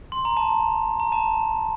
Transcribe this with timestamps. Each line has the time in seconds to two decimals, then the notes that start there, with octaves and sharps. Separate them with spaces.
0.12 C6
0.25 A#5
0.37 A5
0.49 A#5
1.00 A#5
1.12 A5